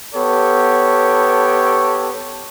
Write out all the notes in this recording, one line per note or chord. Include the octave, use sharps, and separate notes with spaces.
B3 G4 A4 C#5